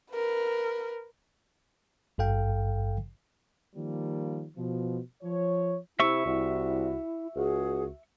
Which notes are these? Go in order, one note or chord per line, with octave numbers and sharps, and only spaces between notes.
A#4 B4
G#1 G2 A4 F5 G5
D#3 F3 G3 A#3
B2 F3
F3 C#5
C3 E4 E5 C#6 E6
C2 E4 F#4
C#2 F#4 G#4